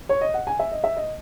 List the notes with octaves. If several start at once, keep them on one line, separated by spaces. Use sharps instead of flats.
C#5
D#5
F#5
G#5
E5
D#5
E5
D#5